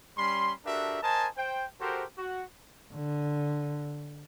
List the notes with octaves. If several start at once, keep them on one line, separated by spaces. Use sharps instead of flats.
G3 C#4 B5 C6
D4 F#4 G4 A4 A#4 E5
A#4 C5 D#5 G#5 A5
C5 G5
F#4 G4 A4 A#4 C5
F#4
D3